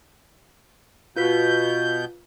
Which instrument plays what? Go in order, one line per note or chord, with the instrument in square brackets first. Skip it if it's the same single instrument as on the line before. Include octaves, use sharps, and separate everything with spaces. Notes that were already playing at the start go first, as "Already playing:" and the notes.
[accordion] B2 G6 [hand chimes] F4 B4 B6